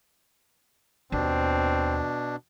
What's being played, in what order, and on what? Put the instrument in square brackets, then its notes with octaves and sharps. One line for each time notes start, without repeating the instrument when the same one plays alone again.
[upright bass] D#2 [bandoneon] B2 D4 [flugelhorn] C4